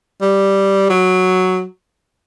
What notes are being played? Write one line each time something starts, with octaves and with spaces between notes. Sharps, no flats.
G3
F#3